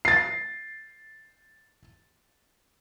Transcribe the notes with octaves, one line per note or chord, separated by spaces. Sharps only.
A6 C7